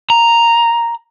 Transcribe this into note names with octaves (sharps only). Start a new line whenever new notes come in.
A#5